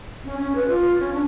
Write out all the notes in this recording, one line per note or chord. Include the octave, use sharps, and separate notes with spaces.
C#4
C#4
B4
F4
C#4
D4